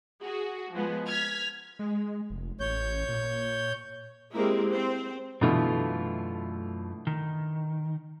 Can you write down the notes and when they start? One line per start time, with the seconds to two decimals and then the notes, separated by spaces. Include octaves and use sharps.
0.23 F#4 G#4
0.72 F3 G#3 B3
1.06 F6 G#6 B6
1.79 G#3
2.30 F1
2.60 A1 C#5 G6
3.09 A#2
4.33 G#3 A#3 C4 E4 G4 A#4
4.71 C4 C5
5.41 F#2 B2 D3 E3 A3 F4
7.07 D#3